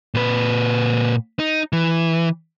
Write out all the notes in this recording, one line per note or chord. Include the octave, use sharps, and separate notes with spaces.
A#2 B4
D#4
E3